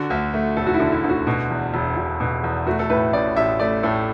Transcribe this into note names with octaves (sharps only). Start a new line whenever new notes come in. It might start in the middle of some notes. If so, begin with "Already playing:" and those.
Already playing: D3 F#4
D2
A3
E1 A4
F#4
E4
D3
E4
D2
F#4
B2
E2
E1
E1
B2
E2
A3 F#4
A4
A2 B4
A1 D5
A1 E5
A3 D5
A2 A4